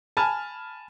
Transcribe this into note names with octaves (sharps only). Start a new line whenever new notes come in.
G#5 A5 B5 F6